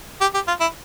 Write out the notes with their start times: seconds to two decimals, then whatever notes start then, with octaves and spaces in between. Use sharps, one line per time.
0.21 G4
0.35 G4
0.48 F4
0.61 E4